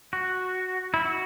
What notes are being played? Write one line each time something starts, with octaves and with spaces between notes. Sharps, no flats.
F#4
E4
F#4